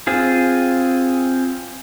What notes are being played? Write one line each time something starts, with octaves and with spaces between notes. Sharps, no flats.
C4 F4 G#4